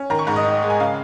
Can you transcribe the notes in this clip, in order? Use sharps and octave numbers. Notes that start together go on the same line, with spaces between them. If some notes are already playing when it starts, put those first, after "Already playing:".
Already playing: C#4
D#3 A#5
C#6
G#2 A#5
D#5
D#4
G#3
G#5
C#3 F5